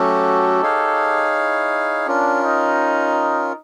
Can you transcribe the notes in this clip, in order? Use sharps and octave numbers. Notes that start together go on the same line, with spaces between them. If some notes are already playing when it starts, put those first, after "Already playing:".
Already playing: F#3 A3 C#4 F#4 G4 A4
D#4 G#4 C#5 F5
E4
C#4 D4 F4 A#4
D#4